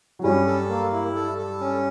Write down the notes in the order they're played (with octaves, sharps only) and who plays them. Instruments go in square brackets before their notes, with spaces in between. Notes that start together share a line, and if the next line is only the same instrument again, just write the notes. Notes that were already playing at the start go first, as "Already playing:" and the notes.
[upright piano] F#3
[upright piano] G2 G3 [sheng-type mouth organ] C#4
[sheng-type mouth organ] A4
A#3
E4
A4
A4
C#4